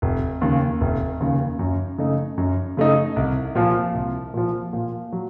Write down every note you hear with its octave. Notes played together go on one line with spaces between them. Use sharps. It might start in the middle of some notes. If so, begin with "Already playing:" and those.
F1
D#2 C#3
F1
D#2 C#3
F#2
C#3 A3 D#4
F#2
C#3 A3 D#4
C2
A#2 F3
C2
A#2 F3
A#2
F#3